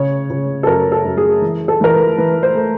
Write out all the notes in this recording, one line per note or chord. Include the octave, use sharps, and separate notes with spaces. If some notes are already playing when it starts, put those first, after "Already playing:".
Already playing: C#3 C#5
C#3
A4
F#2 A#4
A4
F#2
G#4
E3
A4
E3 A#4
B4
E3 B4
C5
A3